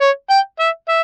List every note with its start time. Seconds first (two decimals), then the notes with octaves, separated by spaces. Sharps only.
0.01 C#5
0.30 G5
0.60 E5
0.88 E5